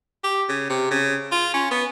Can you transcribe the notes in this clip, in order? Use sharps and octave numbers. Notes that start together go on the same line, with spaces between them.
G4
C#3
C3
C#3
F4
C#4
B3